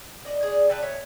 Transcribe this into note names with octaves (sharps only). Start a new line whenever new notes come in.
D5 D#5
G#4 D5
D4 B4 E5 G5
C#5 E5